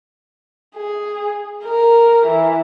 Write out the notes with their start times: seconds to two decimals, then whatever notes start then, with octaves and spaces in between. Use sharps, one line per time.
0.76 G#4
1.64 A#4
2.26 E3